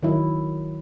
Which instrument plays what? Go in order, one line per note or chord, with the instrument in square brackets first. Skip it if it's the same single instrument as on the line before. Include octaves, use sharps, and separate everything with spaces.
[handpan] D#3 F#3 E4